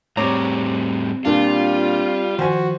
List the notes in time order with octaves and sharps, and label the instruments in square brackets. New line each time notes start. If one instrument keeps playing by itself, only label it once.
[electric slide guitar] A2 G3 [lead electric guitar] C4 A#5 [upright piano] C#5 D6
[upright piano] A#2 D4 [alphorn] G3 [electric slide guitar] F4
[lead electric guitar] D#3 F3 [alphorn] F#4 [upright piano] C5 G#5